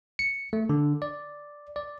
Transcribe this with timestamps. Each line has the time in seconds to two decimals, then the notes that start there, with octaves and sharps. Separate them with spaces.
0.19 C#7
0.53 A3
0.69 D3
1.02 D5
1.76 D5